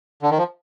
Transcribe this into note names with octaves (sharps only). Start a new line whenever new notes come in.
D3
D#3
F3